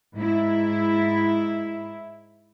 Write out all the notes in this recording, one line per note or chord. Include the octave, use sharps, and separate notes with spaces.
G#2 E4